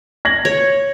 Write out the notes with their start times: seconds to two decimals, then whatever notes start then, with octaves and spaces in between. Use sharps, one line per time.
0.25 G#6 A#6 F#7
0.45 C#5